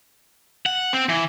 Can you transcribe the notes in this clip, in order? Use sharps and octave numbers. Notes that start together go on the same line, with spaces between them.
F#5
C4
E3